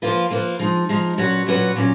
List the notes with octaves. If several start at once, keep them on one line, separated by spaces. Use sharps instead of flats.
F3 A#3 F4 B4
F3 A#3 F4 B4
F3 G#3 D#4
F3 G#3 D#4
A#2 F#3 C#4 F#4 B4
A#2 F#3 C#4 F#4 B4
A#2 F#3 C#4